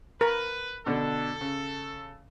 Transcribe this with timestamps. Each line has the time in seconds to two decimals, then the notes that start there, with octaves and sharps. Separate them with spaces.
0.21 A#4 B4
0.86 B2 D3 D4 A4
1.41 C#3